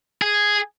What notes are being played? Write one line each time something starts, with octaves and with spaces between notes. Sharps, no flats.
G#4